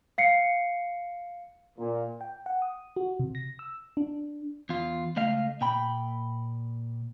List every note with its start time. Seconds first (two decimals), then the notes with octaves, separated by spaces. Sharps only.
0.18 F5 C7 C#7
1.79 A#2
2.21 G5
2.46 F#5
2.62 D#6
2.96 F#4
3.20 C3
3.35 A#6
3.59 E6
3.97 D4
4.69 E2 F4
5.16 C#2 A3 D#5 F5
5.61 A#2 G5 B5